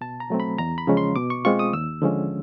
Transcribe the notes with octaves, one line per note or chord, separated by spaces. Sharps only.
B2 A5
A#5
F#3 A3 C4
B5
E2 A#5
B5
C#3 F3 G#3 C#4
C6
B2 D6
C#6
G#3 C4 F4 C#6
D#6
D#2 E6
D3 F3 G#3 C#4